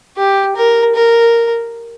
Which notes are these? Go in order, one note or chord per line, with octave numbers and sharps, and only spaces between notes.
G4
A#4
A#4